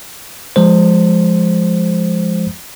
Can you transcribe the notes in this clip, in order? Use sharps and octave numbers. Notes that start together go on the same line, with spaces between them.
F3 G#3 C5